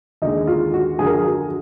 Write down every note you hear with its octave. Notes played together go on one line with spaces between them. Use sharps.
D#2 D3 G#3 D#4
F4
F#4
F#2 D3 F3 G#4
A#4
G#4
F#4